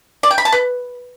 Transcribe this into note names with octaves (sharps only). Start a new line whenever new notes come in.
D5
G5
B5
A5
B4